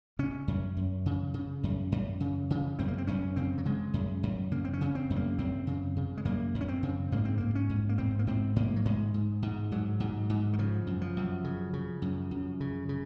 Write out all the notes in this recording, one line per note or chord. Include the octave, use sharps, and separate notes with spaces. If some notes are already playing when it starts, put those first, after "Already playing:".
C#3 C#4
F#2
F#2
C#3
C#3
F#2
F#2
C#3
C#3
F#2 C4
A#3
C4
F#2 C#4
C#3 C4
F#3
C#3 G#3
F#2
F#2
C#3 A#3
C4
C#4
C#3
C4
F#2
A#3
F#2 C4
C#3
C#3
G#3
F#2 A#3
F#2
C#4
C4
C#3
G#2 A#3
C4
G#2 A#3
C#4
G#2
A#3
G#2 C4
A#3
G#2 C4
G#2 A#3
F#3
G#2 G#3
G#2
G#2
G#2 F#3
G#2
G#2
D#3
C#3 F3
F#2
F3
F#2
C#3
C#3
F#2
F#2
C#3
C#3